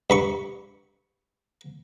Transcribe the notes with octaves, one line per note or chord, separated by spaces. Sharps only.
G2 B5 C#6